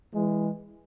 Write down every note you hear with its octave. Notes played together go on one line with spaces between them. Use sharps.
E3 G#3